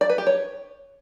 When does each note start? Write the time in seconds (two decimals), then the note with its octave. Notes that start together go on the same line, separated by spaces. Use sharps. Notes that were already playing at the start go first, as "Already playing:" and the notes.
0.01 D5
0.10 B4
0.18 G4
0.27 C#5